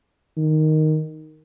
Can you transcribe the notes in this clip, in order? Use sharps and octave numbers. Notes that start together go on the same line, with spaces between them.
D#3